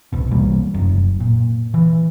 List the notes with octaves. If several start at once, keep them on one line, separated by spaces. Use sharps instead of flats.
E1 C2 B2
C2 E3 G3 A#3
F1 F#2
A#2
E3